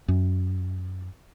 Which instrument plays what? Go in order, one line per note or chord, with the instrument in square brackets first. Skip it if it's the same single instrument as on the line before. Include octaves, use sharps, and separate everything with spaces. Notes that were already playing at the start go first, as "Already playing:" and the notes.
[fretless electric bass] F#2